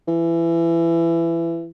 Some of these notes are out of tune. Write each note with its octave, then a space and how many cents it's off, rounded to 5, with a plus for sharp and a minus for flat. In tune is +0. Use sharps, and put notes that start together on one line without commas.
E3 +20